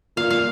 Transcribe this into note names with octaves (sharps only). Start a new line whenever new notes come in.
A#2 F5
F5